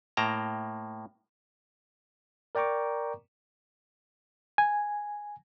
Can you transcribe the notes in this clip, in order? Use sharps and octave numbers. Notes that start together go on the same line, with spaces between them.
A2 A#3 G5 A5 A#5
A#4 D5 G5 A#5 C#6 D6
G#5